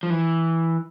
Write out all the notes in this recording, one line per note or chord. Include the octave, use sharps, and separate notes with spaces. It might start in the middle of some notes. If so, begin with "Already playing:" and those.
F3
E3